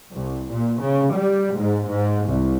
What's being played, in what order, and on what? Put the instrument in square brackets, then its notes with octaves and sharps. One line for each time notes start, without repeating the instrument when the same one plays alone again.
[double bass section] C2
A#2
C#3
G3
G#2
G#2
C2